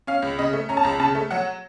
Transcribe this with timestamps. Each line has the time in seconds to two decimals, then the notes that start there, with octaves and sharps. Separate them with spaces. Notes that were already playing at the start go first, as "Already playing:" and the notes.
0.07 C#4 F5
0.22 C#2
0.39 C#3 D#5
0.53 A3
0.69 C#4 A#5
0.77 A5
0.83 C#2 A#5
1.00 C#3 A5
1.15 A3
1.31 F#3 F#5